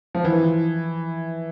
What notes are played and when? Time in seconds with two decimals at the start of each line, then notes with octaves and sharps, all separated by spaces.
0.15 F3
0.24 E3